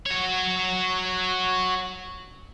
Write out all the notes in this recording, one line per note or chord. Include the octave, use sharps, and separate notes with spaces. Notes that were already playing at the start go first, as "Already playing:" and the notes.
F#4 C#5